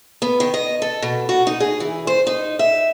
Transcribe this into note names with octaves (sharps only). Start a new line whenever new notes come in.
B3
D#3
D#5
A4
B2
F#4
D#4
G#4
E3
C5
D#4
E5